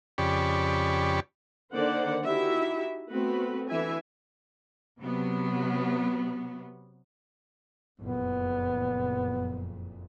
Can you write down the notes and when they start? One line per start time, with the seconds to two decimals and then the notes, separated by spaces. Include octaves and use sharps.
0.18 F2 C#3 G4 D5 B5 C#6
1.73 D3 D#3 A#3 C5 D5 F#5
2.24 D#4 E4 F#4 G4 E5
3.11 A3 B3 C4 F#4 B4
3.69 D3 E3 E5 G#5
5.00 C3 F#3 B3
8.00 F#1 F2 A#2 B3